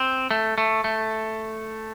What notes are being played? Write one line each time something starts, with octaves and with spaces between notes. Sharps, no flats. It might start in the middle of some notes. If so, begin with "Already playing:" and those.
Already playing: C4
A3
A3
A3